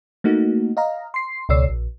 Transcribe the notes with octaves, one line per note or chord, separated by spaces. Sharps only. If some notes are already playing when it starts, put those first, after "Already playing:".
A3 A#3 D#4 F#4
D#5 F5 A#5
C6 C7
C#2 B2 C#5 D5 E6 C7
A#1